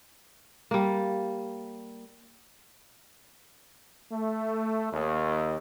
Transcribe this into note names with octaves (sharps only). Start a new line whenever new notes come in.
G3 A#3
A3
D#2